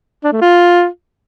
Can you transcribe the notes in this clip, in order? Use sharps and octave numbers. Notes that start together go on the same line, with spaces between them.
D4
A3
F4